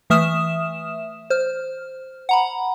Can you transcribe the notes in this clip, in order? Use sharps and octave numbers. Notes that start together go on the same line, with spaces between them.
E3 A3 E5 D#6 F6 E7
C5 F6
F#5 A#5 B5